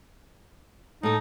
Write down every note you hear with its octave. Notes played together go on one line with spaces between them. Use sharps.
A2 D#4 A4